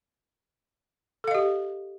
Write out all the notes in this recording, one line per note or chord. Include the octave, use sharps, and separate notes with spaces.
G4 A4 D#5 F5